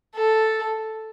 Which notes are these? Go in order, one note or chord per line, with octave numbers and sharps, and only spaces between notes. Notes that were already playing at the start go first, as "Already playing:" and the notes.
A4